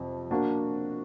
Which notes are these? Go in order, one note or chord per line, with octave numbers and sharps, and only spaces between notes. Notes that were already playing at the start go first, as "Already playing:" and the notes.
Already playing: F2 C3 F3
A#3 D4 F#4